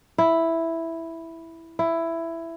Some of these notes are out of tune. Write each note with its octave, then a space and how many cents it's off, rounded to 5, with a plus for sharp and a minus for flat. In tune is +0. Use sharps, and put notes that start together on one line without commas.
E4 +0
E4 +10